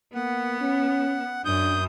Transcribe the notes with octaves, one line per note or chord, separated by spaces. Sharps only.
A#3 B3 F#5
C#4
F#2 D4 D#6 G6